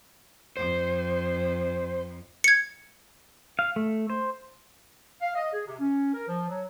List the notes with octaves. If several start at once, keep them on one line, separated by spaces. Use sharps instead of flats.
F2 C5
G#6 C#7
F5
A3
C5
F5
D#5
G#4
C3
C#4
A#4
F3
F#3